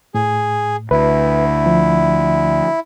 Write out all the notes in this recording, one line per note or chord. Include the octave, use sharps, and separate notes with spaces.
A2 G#4
D2 E4 B4
F3